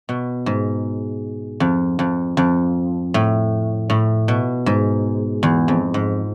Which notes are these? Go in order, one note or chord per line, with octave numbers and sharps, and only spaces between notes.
B2
G#2
F2
F2
F2
A2
A2
B2
G#2
E2
F2
G#2